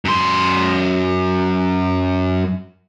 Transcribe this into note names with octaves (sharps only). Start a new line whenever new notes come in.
F#2 C6